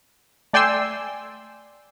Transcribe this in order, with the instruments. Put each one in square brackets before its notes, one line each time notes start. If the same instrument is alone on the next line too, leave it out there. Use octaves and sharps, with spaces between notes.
[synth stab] A3 D5 G5 G#5 C6 E6